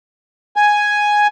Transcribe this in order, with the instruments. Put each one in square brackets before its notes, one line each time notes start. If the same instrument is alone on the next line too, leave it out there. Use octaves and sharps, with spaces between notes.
[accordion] G#5